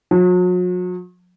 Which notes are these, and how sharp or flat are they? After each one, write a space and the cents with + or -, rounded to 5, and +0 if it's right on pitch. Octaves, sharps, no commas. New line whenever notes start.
F#3 -40